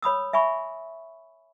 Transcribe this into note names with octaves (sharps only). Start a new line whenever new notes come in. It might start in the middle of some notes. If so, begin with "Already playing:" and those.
C#5 B5 D#6 E6
E5 G#5 B5 C#6